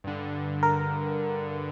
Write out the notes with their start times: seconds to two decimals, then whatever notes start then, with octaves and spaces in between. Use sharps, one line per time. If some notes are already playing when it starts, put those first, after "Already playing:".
0.04 G2 D3
0.63 A#4